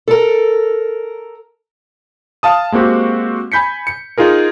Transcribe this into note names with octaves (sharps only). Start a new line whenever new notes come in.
A4 A#4
F5 A5 D#6
G#3 A#3 C4 F#4 G4
G#5 B5 G6 B6 C#7
C#7
D#4 F4 G#4 A#4